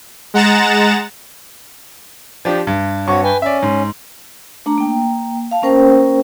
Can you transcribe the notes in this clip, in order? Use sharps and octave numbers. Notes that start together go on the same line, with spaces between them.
G#3 F#5 A#5 A6 E7
F3 D4 G4
G2
G2 C4 F#4 C#5 C#6
B4 G5 G#5
C#4 D5 E5
G#2
A3 D4 A#5
A#3 G5
F5 A5
A#3 C#4 A#4 C5 G5